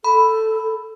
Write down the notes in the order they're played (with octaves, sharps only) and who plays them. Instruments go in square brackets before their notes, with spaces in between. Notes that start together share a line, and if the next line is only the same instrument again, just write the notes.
[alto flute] A4 [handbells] B5